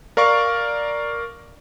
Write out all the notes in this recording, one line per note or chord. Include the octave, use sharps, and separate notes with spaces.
A#4 D5 F5 C#6